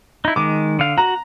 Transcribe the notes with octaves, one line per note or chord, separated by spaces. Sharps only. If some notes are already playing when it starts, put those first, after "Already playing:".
D#4 E4
D#3 G#3 D6
D3 F5
F#4 A#5